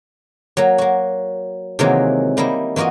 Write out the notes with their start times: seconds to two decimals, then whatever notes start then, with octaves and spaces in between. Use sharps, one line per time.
0.57 F#3 A#3
0.78 A#3 F#4
1.79 C3 D#3 E3 F#3 G#3 A#3
2.37 G3 A#3 D#4 E4
2.76 E3 A#3 F4 F#4 D#5